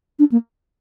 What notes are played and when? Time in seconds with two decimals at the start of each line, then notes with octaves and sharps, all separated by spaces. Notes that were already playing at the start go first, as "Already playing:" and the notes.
0.19 D4
0.32 A#3